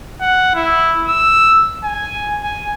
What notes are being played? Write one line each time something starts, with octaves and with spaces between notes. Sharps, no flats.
F#5
E4
E6
G#5
G#5